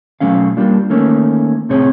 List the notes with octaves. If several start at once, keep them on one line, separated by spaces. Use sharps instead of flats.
B1 F#3 A3 C#4 F5
G3 A#3 D4 F4
D#3 A3 A#3 C#4
C2 A2 C4 G#4 C#5